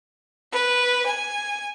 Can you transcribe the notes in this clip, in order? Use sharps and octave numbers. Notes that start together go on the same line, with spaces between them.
B4
G#5